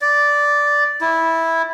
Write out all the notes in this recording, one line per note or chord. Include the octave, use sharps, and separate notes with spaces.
D5
E4